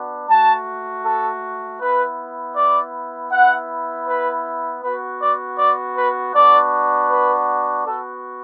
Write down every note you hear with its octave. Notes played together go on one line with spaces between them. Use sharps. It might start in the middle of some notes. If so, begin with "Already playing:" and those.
Already playing: B3 D4 F#4
A3 F#4 A5
A4
B3 E4 B4
D5
B3 E4 F#5
B4
B3 F#4 B4
D5
D5
B4
B3 D4 F#4 D5
B4
B3 F#4 A4